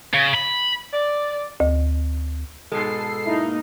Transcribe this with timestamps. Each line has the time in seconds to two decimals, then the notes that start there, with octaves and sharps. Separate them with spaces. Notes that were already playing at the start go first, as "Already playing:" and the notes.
0.14 C#3
0.35 B5
0.93 D5
1.60 D2
2.72 G#2 B2 G#3 A4 C7
3.26 A#3 D#4 E4